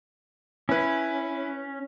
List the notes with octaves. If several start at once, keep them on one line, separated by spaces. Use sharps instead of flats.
C#4 E4 B4